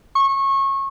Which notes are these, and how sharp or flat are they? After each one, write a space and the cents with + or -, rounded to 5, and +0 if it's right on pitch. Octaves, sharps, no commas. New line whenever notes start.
C#6 -25